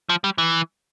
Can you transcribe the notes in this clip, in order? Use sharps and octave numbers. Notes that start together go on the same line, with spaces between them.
F3
G3
E3